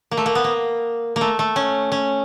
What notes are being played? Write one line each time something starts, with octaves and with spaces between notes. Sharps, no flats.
A#3
A3
A#3
B3
A#3
A#3
A3
A3
C#4
C#4